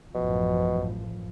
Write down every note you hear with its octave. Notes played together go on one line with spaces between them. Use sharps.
A1 F#2 B2 F3